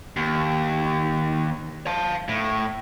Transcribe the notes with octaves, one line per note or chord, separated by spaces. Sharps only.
D#2
F5 A5
A2